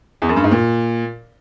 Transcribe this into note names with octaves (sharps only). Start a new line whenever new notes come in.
E2
F#2
G2
G#2
A#2